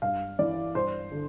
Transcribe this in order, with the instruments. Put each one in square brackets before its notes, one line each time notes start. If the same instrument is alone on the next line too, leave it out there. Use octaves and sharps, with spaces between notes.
[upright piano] G2 F5
E3 D5
G2 C5
D3